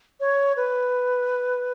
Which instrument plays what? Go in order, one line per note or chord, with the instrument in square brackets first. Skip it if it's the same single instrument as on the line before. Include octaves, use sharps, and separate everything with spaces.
[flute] C#5
B4